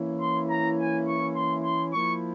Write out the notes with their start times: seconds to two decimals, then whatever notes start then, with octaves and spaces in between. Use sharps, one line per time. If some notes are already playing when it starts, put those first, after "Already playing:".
Already playing: E3 A#3 C#4 E4
0.20 C6
0.50 A#5
0.78 G#5
1.07 C#6
1.35 C6
1.64 C6
1.93 F3 A#3 E4 C#6